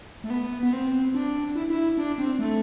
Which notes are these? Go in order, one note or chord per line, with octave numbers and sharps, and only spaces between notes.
A3
B3
B3
C4
D4
E4
E4
D4
C4
A3